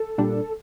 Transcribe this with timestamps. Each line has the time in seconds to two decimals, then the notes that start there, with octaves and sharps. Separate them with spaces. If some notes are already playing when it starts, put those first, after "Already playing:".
Already playing: A4
0.18 A#2 G3 D4